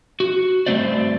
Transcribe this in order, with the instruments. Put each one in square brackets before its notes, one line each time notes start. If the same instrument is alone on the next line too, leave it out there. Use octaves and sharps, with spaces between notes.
[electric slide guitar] F#4
G2 F3 A3 C4 C5 D5